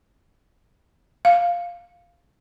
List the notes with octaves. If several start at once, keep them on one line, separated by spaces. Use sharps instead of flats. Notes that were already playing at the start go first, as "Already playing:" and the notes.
F5